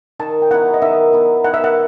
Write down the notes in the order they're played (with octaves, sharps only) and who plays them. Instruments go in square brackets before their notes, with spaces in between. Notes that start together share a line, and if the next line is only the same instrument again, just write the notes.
[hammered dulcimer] D#3 [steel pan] A5
[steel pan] G5
[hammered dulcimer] F#3 B3 E4 [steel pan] F#5
[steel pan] D#5
[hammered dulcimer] D#3 [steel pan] E5
[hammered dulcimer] F#3 B3 E4
[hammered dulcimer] D#3 [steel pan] F#5
[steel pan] E5
F#5